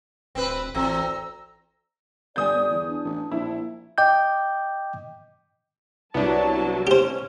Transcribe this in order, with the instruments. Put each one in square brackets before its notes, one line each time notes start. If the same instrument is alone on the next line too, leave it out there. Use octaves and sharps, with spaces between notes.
[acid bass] D1 [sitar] C4 B4
[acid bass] A1 [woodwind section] D2 A#5 E6 [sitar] E3 C4
[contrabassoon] G1 [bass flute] D5 [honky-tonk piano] G#5 D#6 G6
[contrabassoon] G1
E2
[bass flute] D4
[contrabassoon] A1
[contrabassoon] A#1 [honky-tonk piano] E4
[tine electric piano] D#5 G5 D6 G6
[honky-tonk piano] C2 [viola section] F#3 A5 [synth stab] B3 D4
[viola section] C#4 [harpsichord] G4 C5